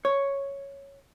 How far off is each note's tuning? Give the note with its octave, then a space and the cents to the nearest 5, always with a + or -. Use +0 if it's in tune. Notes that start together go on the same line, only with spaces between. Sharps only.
C#5 +0